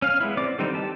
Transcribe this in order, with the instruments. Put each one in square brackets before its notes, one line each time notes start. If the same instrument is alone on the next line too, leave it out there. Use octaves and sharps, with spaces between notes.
[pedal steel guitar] C#4 F5
G#3 B3 E4
C4 D5 D6
D3 E3 G3 C4 D#4
G4 A5